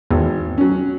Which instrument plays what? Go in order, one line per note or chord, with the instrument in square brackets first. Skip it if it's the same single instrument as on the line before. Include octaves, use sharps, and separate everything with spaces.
[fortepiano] G#1 [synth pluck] E2
[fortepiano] F#3 C#4